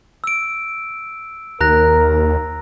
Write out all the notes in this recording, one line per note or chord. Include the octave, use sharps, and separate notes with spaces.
E6 D7
D#2 A#4 A#5 F#6 A#6